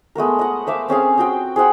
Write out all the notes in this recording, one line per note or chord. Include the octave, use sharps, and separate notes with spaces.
G#3 A3 B3 A#4
D#5 F#5
C5 E5 F5 D6
C4 C#4 G#4 F5
C4 F#4 G5
G#4 C5 F#5 G5